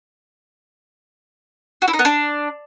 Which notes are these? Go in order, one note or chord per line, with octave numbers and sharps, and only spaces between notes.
F#4
E4
D#4
B3
D4